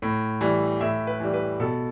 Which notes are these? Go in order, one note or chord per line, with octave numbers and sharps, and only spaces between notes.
A2
E3 G3
A2 E5
B4
E3 G3
B4
B2 A4